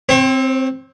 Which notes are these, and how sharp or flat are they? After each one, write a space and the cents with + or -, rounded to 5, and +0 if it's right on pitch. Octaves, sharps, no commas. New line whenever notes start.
C4 +0 C#5 -45